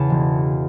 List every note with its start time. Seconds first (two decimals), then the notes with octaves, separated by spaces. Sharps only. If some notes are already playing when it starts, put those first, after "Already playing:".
Already playing: E2 C#3 A5 B5
0.10 E1